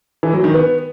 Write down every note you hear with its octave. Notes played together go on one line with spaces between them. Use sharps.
E3
F#3
D#3
B3